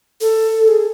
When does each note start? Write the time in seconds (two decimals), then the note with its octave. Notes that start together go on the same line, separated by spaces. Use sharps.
0.21 A4
0.63 A4
0.68 G#4